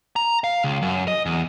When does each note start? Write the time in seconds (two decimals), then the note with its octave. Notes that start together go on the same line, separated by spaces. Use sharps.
0.16 A#5
0.44 F5
0.64 C#2
0.82 F#2
1.08 D#5
1.26 E2